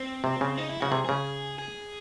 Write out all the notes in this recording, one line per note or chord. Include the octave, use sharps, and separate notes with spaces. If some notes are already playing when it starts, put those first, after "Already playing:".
Already playing: C4
C3
C#3
D#4
E4
C#3 F#4
C3 G#4
C#3 G#4
G#4